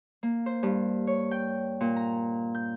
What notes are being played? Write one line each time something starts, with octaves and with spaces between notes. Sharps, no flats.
A#3
C5
G2
C#5
G5
A#2
A#5
G6